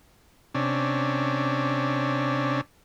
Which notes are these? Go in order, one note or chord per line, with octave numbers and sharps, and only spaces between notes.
C3 C#4 D4